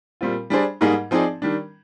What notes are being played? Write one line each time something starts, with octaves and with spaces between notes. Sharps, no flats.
A#2 G3 C4 F4
G3 D4 G#4 C5
G#2 G3 A#3 D#4 G#4
F3 C4 D#4 G#4 D5
D#3 G3 D4